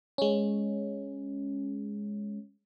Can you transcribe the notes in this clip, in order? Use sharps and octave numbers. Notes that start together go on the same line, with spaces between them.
G#3 C#4